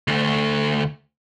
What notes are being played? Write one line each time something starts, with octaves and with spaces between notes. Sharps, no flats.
D2 A3